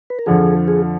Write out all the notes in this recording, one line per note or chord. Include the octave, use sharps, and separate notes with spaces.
B4
A#4
F2 D3 F3 G#4
G#4